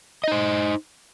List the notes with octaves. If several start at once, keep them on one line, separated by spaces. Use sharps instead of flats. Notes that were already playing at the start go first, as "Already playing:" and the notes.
D#4 C5 D#5